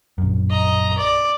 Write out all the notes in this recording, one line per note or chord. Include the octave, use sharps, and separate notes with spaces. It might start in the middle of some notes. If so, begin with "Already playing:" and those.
A#1 F#2
D#5 A#5
D5